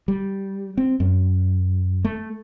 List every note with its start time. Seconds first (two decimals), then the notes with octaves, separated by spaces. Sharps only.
0.08 G3
0.77 C4
1.00 F#2
2.05 A3